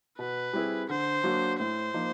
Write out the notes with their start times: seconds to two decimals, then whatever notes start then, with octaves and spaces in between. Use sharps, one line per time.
0.19 B2 B4
0.53 G3 C4 E4 G#4
0.89 D3 C5
1.24 F#3 A#3 D4 F#4
1.59 A2 C5
1.94 F3 A#3 D#4